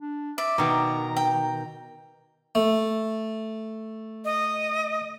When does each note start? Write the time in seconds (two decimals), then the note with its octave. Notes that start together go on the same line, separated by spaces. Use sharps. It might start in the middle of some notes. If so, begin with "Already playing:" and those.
0.01 D4
0.38 D5 E5
0.58 B2 D#3 A#5
1.16 G5
2.55 A3
4.25 D#5